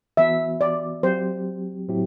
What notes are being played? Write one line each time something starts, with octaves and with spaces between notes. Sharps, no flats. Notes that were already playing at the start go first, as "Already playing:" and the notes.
E3 B3 F#4 E5
D5
F#3 C4 G4 C5
A2 F#3 C4 E4 G4